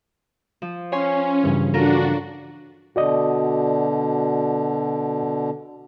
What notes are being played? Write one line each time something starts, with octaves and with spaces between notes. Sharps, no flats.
F3
C#4 C#5 G#5 C6
G2 C#3 E3
D4 F4 F#4 A4 A#4
B2 D3 F#4 D5 D#5